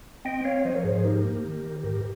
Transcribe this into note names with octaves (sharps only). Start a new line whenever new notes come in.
C4 D#5 G5
C4 C#5 F5
F3 C5 D#5
A#4 C#5
G#2 G#4 C5
G#4 C5
D#4 G4 A#4
A#3
D#3
D#3
G#2 G4 A#4